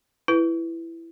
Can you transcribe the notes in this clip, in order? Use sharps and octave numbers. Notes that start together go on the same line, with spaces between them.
E4 B4